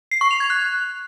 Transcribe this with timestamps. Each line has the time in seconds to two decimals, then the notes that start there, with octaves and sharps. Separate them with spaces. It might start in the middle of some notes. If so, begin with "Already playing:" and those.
0.11 C7
0.21 C#6
0.31 F7
0.40 G#6
0.50 F#6